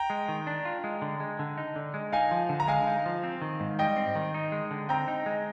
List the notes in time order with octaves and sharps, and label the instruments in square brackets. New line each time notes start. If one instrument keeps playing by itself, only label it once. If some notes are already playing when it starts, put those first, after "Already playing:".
Already playing: [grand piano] G5 A#5
[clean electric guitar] G#3
D#3
D4
F4
G#3
D3
G#3
D3
D#4
D3
G#3
[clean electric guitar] D#4 [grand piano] F5 G#5
[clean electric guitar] F3
D3
[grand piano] A#5
[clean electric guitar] G#3 [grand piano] F5 G#5
[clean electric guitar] D#4
F3
C4
D#3
G#2
[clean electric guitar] G3 [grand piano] D#5 G5
[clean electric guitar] C4
D#3
D#4
G#3
D3
[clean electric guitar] C4 [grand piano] G5 A#5
[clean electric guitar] D#4
G#3